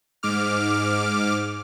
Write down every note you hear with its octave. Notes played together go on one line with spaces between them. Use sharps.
G#2 D6 F6